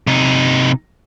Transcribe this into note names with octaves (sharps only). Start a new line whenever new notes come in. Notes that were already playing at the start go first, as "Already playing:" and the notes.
C3 D#4